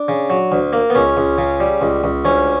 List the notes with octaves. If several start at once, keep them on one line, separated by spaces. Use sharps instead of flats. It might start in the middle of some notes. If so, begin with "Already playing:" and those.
Already playing: D4
C#3
F#3
D2
A#3
B3
C#2 C#4
C#2
C#3
G3
C#2
C#2
D2 C#4